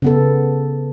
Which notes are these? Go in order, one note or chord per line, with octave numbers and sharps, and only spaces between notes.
C#3 B3 A4